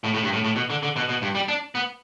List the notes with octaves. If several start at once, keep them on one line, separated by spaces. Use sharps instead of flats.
A2
A2
G2
A2
A2
B2
D3
D3
B2
B2
G2
G3
D4
B3